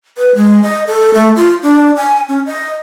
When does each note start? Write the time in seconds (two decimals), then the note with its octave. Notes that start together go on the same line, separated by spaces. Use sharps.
0.18 B4
0.35 G#3
0.63 D#5
0.87 A4
1.14 A3
1.36 F4
1.63 D4
1.97 G#5
2.28 C#4
2.46 D#5